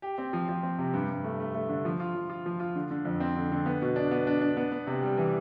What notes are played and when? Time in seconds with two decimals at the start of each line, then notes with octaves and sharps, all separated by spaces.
0.02 G4
0.18 C4
0.33 F3
0.49 F3
0.63 C4
0.78 C3
0.93 G2
1.09 G2
1.24 A3
1.40 A3
1.55 A3
1.69 D3
1.85 F3
2.00 F4
2.15 F3
2.30 F4
2.46 F3
2.60 F4
2.76 D3
2.91 D3
3.05 F2
3.20 C4
3.36 D3
3.51 D3
3.66 B3
3.82 B2
3.96 D4
4.11 B3
4.27 D4
4.41 D4
4.57 B3
4.72 B3
4.87 C3
5.02 G3
5.17 E3